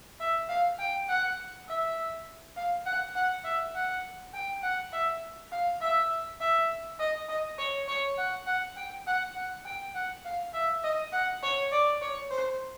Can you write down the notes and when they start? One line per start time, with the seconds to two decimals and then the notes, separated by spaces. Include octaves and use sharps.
0.20 E5
0.49 F5
0.79 G5
1.09 F#5
1.68 E5
2.56 F5
2.86 F#5
3.16 F#5
3.44 E5
3.75 F#5
4.33 G5
4.63 F#5
4.92 E5
5.52 F5
5.81 E5
6.40 E5
7.00 D#5
7.29 D#5
7.58 C#5
7.88 C#5
8.18 F#5
8.47 F#5
8.77 G5
9.07 F#5
9.36 F#5
9.65 G5
9.95 F#5
10.25 F5
10.54 E5
10.84 D#5
11.13 F#5
11.43 C#5
11.72 D5
12.02 C#5
12.31 C5